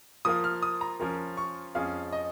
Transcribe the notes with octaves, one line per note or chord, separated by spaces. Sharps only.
F3 A#3 F4 D#6
F6
D#6
A#5
F3 C#4 F4 A#4
C#6
F2 F3 C#4 G#4 F5
D#5